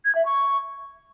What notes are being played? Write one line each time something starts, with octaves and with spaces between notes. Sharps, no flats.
G#6
E5
C#6